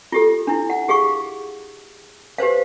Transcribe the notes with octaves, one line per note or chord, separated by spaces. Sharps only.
F4 G4 A4
D4 E4
F#5
G4 G#4 F5 C#6
G4 B4 C5 F5